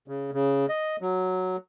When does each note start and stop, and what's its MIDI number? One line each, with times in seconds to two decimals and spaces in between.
0.08 0.31 49
0.34 0.66 49
0.69 0.96 75
1.01 1.56 54